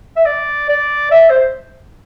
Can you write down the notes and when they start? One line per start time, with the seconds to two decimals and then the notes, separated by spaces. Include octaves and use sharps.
0.16 E5
0.26 D5
0.69 D5
1.11 E5
1.30 C5